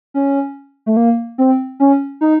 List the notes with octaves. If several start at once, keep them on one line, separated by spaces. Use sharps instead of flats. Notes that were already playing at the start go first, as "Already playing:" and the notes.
C#4
A3
A#3
C4
C#4
D#4